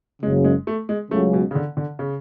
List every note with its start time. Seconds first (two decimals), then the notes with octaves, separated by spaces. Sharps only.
0.22 F#1 F#2 C#3 G#3
0.44 G#3
0.67 A3
0.89 G#3
1.11 C#2 C#3 F#3 A3
1.33 B2
1.51 C#3
1.55 D3
1.77 D3
1.99 C#3